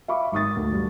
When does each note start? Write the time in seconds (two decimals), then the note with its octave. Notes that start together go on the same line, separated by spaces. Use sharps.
0.08 E5 F5 B5 C#6 D6
0.32 G#1 C#6 D#6 A6
0.56 D2
0.73 G2